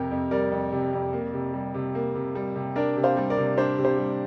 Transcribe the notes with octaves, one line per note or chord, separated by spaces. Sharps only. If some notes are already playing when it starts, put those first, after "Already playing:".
Already playing: F2 C3 G4 A#4
F2
G3 A#4 D5
F2
C3
F2
A#3
C3
G3
C3
A#3
C3
G3
C3
D4 A#4 D5
C3
C5 F5
G3
A#4 D5
C3
D4 G4 C5
C3
G4 C5
G3